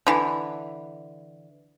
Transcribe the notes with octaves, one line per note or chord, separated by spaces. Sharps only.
D3 E3